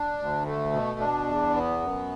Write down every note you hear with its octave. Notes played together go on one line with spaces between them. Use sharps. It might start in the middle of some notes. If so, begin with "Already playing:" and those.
Already playing: D4
D2
A3
B2
D4
E2
B3
F#2